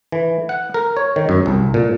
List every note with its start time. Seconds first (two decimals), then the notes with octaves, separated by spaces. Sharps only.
0.12 E3
0.49 F#5
0.74 A#4
0.97 C#5
1.16 D#3
1.29 F#2
1.46 C2
1.74 A#2